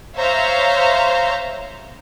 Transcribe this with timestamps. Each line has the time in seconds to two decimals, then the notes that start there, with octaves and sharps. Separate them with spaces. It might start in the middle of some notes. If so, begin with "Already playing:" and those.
0.15 C5 C#5 E5 F5 A#5